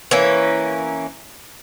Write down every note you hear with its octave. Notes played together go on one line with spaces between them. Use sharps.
E3 A#3 C#4